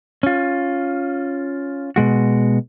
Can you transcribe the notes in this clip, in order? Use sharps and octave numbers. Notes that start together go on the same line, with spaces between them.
C#4 F4
B2 G#3 F#4